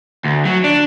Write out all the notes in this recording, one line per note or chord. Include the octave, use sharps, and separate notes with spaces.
D2
F#3
D4